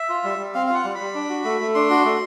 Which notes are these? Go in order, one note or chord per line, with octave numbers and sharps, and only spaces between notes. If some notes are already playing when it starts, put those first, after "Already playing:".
Already playing: E5
F4
G3
G3
C4 F5
F5
F4 F#5
G3
G3 B5
D4
F#4
A3
A3
D4 C6
F#4
A3